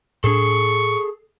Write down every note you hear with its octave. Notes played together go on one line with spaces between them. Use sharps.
A2 D4 G#4 A4 C#6